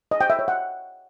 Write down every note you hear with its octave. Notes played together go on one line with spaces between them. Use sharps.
D#5
G5
E5
C#5
F#5